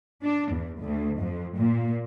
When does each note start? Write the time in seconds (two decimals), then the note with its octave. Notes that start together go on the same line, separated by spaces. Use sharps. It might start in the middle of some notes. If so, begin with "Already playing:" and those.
0.23 D4
0.51 E2
0.81 D2
1.20 F2
1.59 A#2